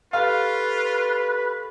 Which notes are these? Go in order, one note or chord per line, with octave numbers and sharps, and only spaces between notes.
F4 G4 A4 B4 F5 C#6